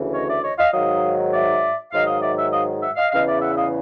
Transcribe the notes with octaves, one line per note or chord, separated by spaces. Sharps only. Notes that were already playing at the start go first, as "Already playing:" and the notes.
Already playing: D2 C#3 E3
C#5 D#5
D5 E5
C#5 D#5
D#5 F5
G#2 D#3 F#3 D#5 F5
D5 E5
G#2 D#3 F#3 D#5 F5
D#5 F5
D5 E5
E5 F#5
D#5 F5
E5 F#5
D#5 F5
E2 C#3 E3 D#5 F5
D5 E5
E5 F#5
D#5 F5